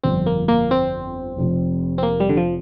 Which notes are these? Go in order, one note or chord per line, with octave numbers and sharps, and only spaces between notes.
G1 F2 F3 C4
A#3
A#3
C4
F1 F2 C3
C4
A#3
G3
D3
F3